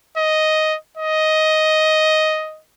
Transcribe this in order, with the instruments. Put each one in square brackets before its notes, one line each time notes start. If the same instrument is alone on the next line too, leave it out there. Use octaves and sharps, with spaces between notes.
[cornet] D#5
D#5